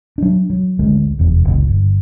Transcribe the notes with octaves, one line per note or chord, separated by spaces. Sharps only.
F#3 D4
F#3
G#1 D2 G#3
F1 E2
F#1 C#2
G1